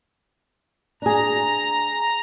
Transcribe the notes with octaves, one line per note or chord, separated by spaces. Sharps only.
D4 G#4 A#5